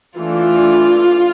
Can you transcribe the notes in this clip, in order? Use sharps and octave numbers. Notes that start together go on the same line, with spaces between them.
E3 A3 D4 F4